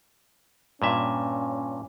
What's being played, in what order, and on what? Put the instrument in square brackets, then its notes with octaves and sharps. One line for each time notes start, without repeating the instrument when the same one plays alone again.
[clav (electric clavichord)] G2 A#2 E5 [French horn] C#4